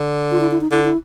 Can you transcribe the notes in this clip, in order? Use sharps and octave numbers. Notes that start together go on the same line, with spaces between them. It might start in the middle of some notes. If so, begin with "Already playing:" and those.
Already playing: D3
F4
E4
E4
D#4
D3 E4
E4